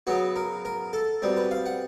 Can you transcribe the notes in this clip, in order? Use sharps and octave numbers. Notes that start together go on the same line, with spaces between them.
C#3 F#3 B3 F#4
A#4
A#4
A4
B2 G3 C4
B4
F5
F#5